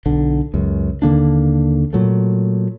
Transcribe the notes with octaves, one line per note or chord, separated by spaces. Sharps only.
B1 D3
C#2 F#2
D#2 D3 A#3 D4
A#2 F#3 A3